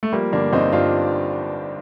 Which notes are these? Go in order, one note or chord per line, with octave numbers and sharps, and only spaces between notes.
A3
F3 G3 A#3
G1 A#3 D4
G1 C4 D#4
G2 D4 F4